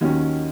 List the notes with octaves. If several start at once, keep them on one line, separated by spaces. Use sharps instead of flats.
D#2 D#3 F#3 C#4